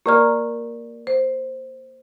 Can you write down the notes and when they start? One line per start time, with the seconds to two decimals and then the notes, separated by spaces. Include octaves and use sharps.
0.06 A#3 G4 A#4 D5 A#5 F6
1.07 C5